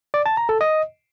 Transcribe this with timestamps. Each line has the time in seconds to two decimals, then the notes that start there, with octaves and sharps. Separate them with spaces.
0.14 D5
0.26 A5
0.37 A#5
0.49 A4
0.61 D#5